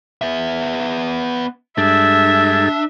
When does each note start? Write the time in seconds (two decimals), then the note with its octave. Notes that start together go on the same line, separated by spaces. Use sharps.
0.22 B3 E5
1.78 G2 G#3 D4 A4 E5